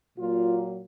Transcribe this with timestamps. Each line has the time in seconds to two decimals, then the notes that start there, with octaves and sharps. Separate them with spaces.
0.18 A#2 F#3 A#3 F4